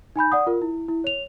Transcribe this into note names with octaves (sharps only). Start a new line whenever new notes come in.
D#4 G#5 B5 G6
D5 F#5 D#6
F4 A#4
E4
E4
C#5 F7